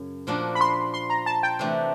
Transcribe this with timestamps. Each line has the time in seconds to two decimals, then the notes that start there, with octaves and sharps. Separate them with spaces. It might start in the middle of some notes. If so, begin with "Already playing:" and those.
Already playing: F#2 C#3
0.27 A#2 F3 A#3 D4 F#4
0.55 B5
0.61 C6
0.94 C6
1.10 A#5
1.26 A5
1.43 G5
1.59 C3 E3 A3 D4 F#4